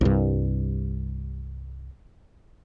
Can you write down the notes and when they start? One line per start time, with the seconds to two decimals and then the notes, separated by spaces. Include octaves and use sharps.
0.01 C2 G2